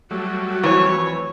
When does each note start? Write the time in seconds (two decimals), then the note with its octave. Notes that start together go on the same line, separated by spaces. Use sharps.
0.11 F#3 G3 A3 F#4
0.63 F2 E3 C#5